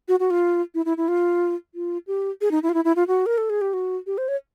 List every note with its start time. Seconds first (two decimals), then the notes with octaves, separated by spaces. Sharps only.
0.08 F#4
0.20 F#4
0.31 F4
0.75 E4
0.85 E4
0.97 E4
1.08 F4
1.75 F4
2.07 G4
2.41 G#4
2.51 D#4
2.63 E4
2.69 F4
2.74 E4
2.85 E4
2.96 F4
3.08 F#4
3.26 A#4
3.38 A4
3.50 G#4
3.61 G4
3.73 F#4
4.07 G4
4.18 C5
4.28 C#5